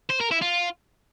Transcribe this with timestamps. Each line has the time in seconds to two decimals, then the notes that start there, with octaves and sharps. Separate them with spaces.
0.10 C5
0.21 A#4
0.31 E4
0.42 F4